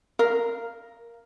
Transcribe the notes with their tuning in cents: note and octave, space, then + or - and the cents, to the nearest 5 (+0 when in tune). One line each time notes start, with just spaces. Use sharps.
A#4 +0 F5 -15